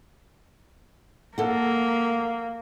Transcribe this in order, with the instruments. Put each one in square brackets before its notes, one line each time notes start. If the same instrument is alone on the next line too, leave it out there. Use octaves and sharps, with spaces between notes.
[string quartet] A#3 [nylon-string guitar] A4 F#5